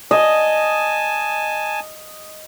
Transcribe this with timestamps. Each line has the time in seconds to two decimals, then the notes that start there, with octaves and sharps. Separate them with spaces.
0.11 D#5 G#5 A5